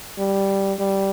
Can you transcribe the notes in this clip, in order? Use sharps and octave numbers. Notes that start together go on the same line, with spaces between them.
G3
G3